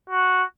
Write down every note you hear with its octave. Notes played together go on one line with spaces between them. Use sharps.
F#4